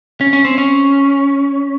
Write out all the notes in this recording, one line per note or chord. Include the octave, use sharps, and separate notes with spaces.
C#4
C#4
C4
C#4